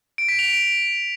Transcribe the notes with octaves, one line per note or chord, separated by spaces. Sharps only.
D7
B6
F7
D7